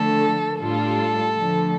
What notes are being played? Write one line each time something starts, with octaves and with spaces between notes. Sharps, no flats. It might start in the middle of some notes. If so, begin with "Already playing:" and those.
Already playing: D3 F3 A3 A4
A2 G3 D4 F4 A4
D3 F3 A3